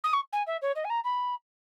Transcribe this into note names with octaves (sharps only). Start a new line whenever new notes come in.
D#6
C#6
G#5
E5
C#5
D#5
G#5
A#5
B5